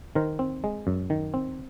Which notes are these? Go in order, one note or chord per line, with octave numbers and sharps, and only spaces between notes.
D#3 A#4 C5
C4
G#3
F#2
D#3
C4